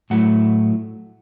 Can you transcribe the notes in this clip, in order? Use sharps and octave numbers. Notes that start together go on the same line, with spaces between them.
A2 F#3 A3 E4 F#5